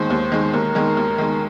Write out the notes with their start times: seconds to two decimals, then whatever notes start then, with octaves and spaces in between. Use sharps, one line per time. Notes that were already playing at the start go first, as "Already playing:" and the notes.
Already playing: D#2 D#3 G#3 C5
0.10 D#2
0.32 D#3 G#3
0.53 D#2 A#4
0.75 D#3 G#3
0.97 D#2
1.18 D#3 G#3